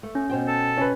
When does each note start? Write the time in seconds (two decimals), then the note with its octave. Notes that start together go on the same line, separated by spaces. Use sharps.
0.03 A3
0.15 C#4
0.30 B2 C5 G5
0.48 A4
0.77 C#4 B4